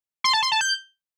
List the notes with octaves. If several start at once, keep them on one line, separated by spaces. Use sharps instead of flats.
C6
A5
C6
A5
G6